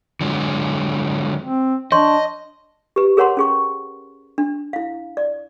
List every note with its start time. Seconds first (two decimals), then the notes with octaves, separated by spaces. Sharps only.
0.21 D3 F#3 G#3
1.42 C4
1.92 D4 C#5 D#5 C6 C#6
2.96 G4 B4
3.17 G#4 A#4 C#5 F#5 A#5 C6
3.37 C#4 G#4 C#6
4.38 D4
4.73 E4 F5
5.17 D5